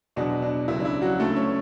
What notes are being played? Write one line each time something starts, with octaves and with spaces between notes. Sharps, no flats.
E2 B2 F#3 B3 D4
D4
C#2 C#3 F#3 E4
D4
E4
F#3 F#4
D2 C#3 F#3 A3 A4
C#4 C#5